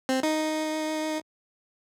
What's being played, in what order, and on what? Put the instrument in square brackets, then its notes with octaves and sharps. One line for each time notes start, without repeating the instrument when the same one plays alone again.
[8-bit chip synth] C4
D#4